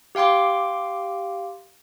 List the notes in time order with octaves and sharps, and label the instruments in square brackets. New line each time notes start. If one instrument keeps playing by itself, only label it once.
[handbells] G4 F5 G5 C6 D6